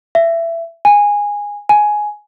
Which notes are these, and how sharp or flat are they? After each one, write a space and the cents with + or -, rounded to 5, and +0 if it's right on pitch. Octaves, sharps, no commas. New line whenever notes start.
E5 +20
G#5 -15
G#5 +10